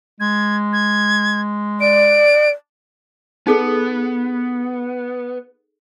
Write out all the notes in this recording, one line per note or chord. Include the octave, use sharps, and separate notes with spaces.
G#3 G#6
G#6
D5 D7
B3 D#4 G#4 A4